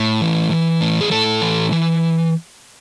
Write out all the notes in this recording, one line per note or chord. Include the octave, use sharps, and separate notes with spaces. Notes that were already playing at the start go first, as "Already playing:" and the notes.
Already playing: A2
E3
E3
A2
G#4
A2 A4
E3
E3